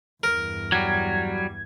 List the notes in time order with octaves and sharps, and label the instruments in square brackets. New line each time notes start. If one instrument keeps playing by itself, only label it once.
[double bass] E2 G2 [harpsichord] A#4
[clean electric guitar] F#3 G3 [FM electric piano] G#6